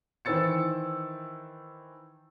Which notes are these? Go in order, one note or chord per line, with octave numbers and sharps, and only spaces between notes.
D#3 E3 C5 E6 A6 C#7